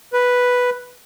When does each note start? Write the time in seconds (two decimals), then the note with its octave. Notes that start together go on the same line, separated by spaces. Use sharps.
0.13 B4